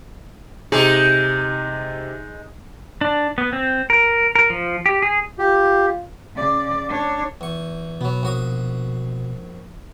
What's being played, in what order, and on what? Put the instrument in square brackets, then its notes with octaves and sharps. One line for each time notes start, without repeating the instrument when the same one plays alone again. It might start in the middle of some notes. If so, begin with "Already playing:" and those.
[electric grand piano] C3 [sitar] G#3 D#4 G#4
[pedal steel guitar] D4
B3
C4
A#4
A#4
F3
G4
G#4
[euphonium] F4 [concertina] G4
[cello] C#3 D5
D4 C#5
[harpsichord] E2 C#6
[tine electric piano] B2 [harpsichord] F#3 B3
[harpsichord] A#1 F#4 D#6